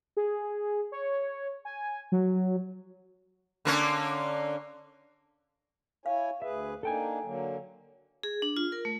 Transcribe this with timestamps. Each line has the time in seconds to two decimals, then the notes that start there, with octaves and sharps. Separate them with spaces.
0.17 G#4
0.92 C#5
1.65 G#5
2.12 F#3
3.65 D3 A#3 C#4
6.06 E4 C#5 F5 G#5
6.42 D2 G#4 B4 E5
6.83 A#3 D4 D#4 A4 G5 G#5
7.24 D3 F#3 A#3
8.23 G#4
8.42 D4
8.57 F4
8.72 A#4
8.85 A3